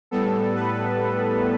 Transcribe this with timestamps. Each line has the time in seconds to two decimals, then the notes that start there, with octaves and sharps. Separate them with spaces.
0.11 A2 G3 B3 A4
0.55 B4